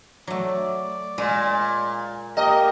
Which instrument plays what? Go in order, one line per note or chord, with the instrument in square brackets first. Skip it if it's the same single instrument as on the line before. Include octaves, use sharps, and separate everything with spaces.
[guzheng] F#3 A3 [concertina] D5
[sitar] A#2 [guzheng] G#3
[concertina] A#3 G4 A#4 [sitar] D#5